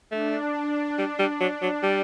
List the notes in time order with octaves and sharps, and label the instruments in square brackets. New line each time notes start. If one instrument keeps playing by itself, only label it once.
[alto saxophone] A3 [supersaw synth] D4
[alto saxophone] G3
G3
F#3
F#3
G3